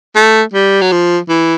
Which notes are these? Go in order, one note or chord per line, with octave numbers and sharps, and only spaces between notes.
A3
G3
F#3
F3
E3